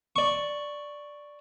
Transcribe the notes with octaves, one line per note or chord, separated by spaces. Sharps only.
D5 C#6